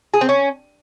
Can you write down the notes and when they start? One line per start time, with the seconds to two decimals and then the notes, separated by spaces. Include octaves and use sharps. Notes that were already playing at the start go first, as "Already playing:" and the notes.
0.14 G#4
0.21 C4
0.29 C#4